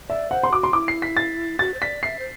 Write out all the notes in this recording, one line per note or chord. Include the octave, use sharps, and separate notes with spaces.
D5 E5
C5 F#5
C6
F#4 D6
C6
E4 D6
C7
B6
A6
F#4 A6
C5
D5 B6
E5 C7
C5